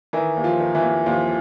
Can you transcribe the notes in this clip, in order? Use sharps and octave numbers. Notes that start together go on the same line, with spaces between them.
D#3 E3 E4
D#2
F3 F4
D#3
E3 E4
D#2
D#2 F3 F4